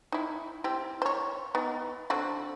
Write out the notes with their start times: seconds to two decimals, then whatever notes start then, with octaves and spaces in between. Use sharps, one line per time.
0.12 D#4 E4
0.64 C4 E4 G4
1.02 C5 C#5
1.55 B3 D#4
2.10 D3 C4 F#4